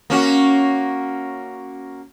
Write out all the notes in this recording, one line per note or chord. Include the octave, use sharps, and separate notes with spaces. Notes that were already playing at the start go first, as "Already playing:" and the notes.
A#3 C#4 F#4